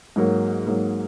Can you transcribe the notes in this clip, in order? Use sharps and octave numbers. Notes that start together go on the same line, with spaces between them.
G#2 F#3 A#3
G#2 F#3 A#3